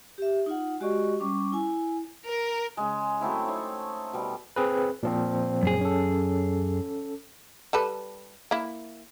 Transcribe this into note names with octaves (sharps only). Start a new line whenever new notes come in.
G4 E5
D#4 F4 F#5
G#3 F#4 G4 D5 D#5 C#6
G3 C#4 C#6 D6
E4 G#5
A#4
C#3 G#3
F#3 A3 C4 E4
C4 D#4 C#5
B2 G3
C4 G#4 B4
A#2 F3 C4
F#2 G#4
C#4 A4
G3 A4 B4
A#3 E4